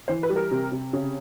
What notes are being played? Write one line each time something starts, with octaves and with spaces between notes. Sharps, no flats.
E3 C5
B4
G3
A#4
C3
C3
C#3